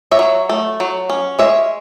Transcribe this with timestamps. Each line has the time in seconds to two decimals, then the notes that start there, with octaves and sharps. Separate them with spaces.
0.11 C#5 E5
0.19 F#3
0.49 A3
0.80 F#3
1.10 C#4
1.39 G#3 C#5 E5